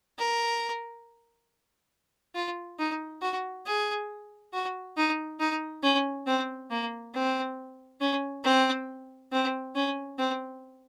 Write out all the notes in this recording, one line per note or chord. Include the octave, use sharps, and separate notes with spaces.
A#4
F4
D#4
F#4
G#4
F#4
D#4
D#4
C#4
C4
A#3
C4
C#4
C4
C4
C#4
C4